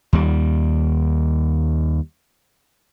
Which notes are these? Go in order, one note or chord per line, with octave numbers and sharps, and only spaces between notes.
D#2 G3